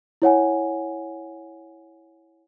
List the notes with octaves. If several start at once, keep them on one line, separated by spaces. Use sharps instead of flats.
E4 C#5 F#5 G#5